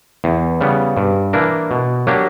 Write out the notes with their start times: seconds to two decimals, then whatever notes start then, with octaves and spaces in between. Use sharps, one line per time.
0.24 E2
0.61 C#3 G3 B3
0.97 G2
1.33 E3 A#3 D4 A#4
1.71 B2
2.07 F#3 A#3 D4 G4